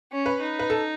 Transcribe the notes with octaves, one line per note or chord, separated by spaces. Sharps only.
C#4
B4
D#4
B4
A4